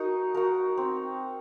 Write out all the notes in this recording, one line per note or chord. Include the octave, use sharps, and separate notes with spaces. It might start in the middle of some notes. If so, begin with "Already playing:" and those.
Already playing: D#4 F#4 A#4
F#4 A#4
C4